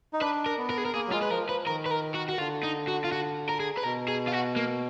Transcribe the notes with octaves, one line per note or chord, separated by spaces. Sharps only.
D#4
D4 B4
A#4
B3
A#4
G#4
A#4
A#3 G#4
F#3
G#3 F4
B4
F3 A#4
F3 B4
D#3 A#4
B4
A#4
F#4
F#4
D3 F4
D#4
F#4
F4
F#4
A#4
G#4
B4
B2 A#4
G#4
F4
F#4
A#3